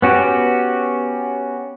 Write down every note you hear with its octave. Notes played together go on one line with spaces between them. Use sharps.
B3 C#4 F#4 G4